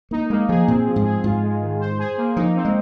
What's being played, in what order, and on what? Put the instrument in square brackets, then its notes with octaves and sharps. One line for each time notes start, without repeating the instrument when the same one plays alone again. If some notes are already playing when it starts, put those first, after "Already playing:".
[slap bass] A#3 [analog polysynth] D#4
[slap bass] G#3 [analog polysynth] A#3
[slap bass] F3 [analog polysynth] G#4
[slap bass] A#2 [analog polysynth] C4
[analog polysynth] F3
[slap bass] G#2
[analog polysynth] G#4
[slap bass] G#2 [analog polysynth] F4
[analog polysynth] G#3
D#3
C5
G#4
A#3
[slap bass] F3 [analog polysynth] D#4
[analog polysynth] C4
[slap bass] G#3